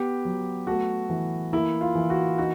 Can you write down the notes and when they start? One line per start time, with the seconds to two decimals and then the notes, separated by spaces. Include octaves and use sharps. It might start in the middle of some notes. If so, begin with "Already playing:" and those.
Already playing: B3 G4
0.25 F#3
0.67 A3 F#4
1.10 E3
1.53 A#3 E4
1.81 F4
1.95 E3
2.10 F#4
2.38 D#4 F#4